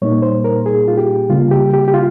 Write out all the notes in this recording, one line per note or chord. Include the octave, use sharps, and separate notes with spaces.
A#2 G3 A#3 D#4 C#5
C5
A#4
G#4
F4
G4
C#3 G3 A#3 C#4 F4
G4
G4
G4
F4